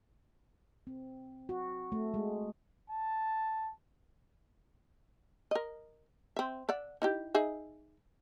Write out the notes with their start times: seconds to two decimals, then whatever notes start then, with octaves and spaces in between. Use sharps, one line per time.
0.87 C4
1.49 F#4
1.92 A3
2.14 G#3
2.90 A5
5.51 A#4 D#5
6.36 C4 E5
6.69 D5 E5 F#5
7.02 D#4 E4 G4
7.35 D#4 G#4 E5